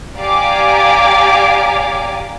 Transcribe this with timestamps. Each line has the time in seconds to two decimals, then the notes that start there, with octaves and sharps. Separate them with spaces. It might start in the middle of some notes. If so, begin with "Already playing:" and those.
0.17 G4 D5 F5 G#5 A#5 D6